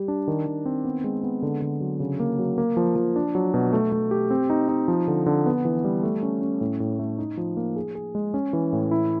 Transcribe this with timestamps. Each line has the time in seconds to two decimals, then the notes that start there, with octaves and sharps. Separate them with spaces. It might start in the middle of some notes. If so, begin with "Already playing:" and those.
Already playing: G3 G4
0.08 D4
0.28 D#3
0.46 D#3
0.66 C4
0.85 B3
1.04 G#3
1.23 B3
1.43 D3
1.62 D3
1.81 F#3
2.00 C#3
2.20 A#3
2.39 F#3
2.58 A#3
2.77 F3
2.96 F3
3.16 D4
3.35 F#3
3.54 B2
3.73 A3
3.92 A3
4.11 G4
4.31 C4
4.50 D#4
4.69 D#4
4.88 F3
5.08 D3
5.26 D3
5.46 B3
5.65 E3
5.84 G3
6.03 A3
6.23 C#4
6.41 C#4
6.61 A2
6.80 A2
6.99 A3
7.18 D#4
7.37 F3
7.57 A#3
7.76 G#4
7.95 G#4
8.15 G#3
8.34 C#4
8.53 E3
8.73 A2
8.91 E4